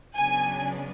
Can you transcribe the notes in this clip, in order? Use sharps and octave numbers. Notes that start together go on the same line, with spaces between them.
C#3 F#3 B3 D4 G#5